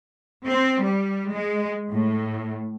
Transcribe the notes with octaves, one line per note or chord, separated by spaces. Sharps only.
C4
G3
G#3
A2